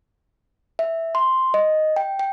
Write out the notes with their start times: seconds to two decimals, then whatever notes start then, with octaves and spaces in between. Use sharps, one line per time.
0.79 E5
1.15 C6
1.54 D#5
1.96 G5
2.19 G5